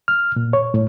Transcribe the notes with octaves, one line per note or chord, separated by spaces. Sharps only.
F6
A#2
C#5
A2